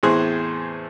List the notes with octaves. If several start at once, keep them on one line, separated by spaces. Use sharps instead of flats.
E2 A2 C4 G#4 C5 F#6